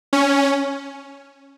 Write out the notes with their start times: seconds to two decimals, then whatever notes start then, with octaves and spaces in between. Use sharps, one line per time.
0.13 C#4